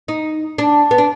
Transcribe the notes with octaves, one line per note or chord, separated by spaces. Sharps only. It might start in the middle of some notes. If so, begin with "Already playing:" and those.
D#4
D4
B3
D4